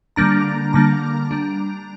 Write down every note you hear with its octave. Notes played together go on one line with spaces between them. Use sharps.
D3 G3 A#3 D4 A#5
D3 G3 A#3 D4 A#5
G3 D4